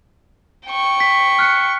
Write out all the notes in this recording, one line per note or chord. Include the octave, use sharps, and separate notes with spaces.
G5 C#6
B6
F6 F#6 C#7